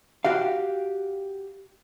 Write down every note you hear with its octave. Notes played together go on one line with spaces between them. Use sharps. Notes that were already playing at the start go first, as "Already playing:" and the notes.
F#4 G4 F5